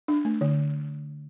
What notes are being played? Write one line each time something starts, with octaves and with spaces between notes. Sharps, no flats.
D4
A3
D3